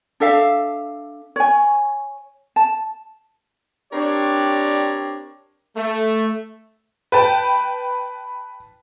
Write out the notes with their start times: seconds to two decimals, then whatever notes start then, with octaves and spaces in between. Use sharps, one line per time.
0.20 D4 A4 E5 F5
1.36 C#5 G#5
2.56 A5
3.93 C4 D4 G4 A#4 C#5 D5
5.77 A3
7.12 B4 G5 A5